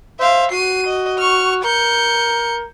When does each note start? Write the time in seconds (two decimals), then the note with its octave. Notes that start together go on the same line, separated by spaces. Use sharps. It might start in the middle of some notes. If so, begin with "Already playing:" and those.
0.19 C5 E5 F5
0.52 F#4 C7 D#7
0.87 D#5
1.19 C#6 F6
1.64 A#4 G6 C#7